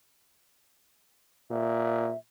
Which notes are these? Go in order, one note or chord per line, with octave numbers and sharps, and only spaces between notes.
A#2 E5